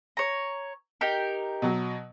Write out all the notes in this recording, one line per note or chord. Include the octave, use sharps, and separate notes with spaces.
C#5 A#5
D#4 G4 A#4
B2 F#3